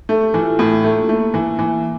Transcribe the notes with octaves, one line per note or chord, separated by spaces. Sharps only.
A3 A4
G4
E3 F4
E4
A2 D4
A3
A#3
A3 A#3
E3
E3